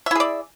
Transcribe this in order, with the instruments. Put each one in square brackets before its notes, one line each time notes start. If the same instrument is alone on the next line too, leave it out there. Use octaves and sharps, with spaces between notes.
[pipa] E5
E4
G#4
D5